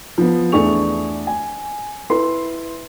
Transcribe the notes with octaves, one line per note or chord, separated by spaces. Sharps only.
F3 B3
E2 A3 D4 G#4 C#6 F7
G#5
E4 B4 C6